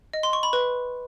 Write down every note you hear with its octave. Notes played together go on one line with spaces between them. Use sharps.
D#5
C6
C#6
B5
B4